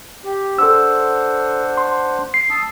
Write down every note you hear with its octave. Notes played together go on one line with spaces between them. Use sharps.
G4
D4 A4 C5 F#5 E6
C6
C7
A5 D#6 E6